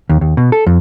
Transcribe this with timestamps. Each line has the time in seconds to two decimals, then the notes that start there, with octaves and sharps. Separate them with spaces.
0.09 D#2
0.21 D#2
0.37 B2
0.52 A4
0.67 F2